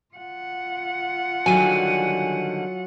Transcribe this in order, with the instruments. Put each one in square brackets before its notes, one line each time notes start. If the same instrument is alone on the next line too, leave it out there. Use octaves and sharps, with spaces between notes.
[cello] F4 F#5
[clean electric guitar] D3 D#3 G3 [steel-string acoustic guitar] F#3 [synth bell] G#5 D#7